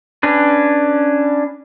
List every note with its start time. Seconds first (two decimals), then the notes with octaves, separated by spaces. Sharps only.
0.23 C#4 D4 B4